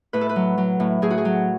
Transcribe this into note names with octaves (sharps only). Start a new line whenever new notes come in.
A2 B4
A4
B4
F#3
F#3
A2
A2 G#4
F#4
G#4
F#3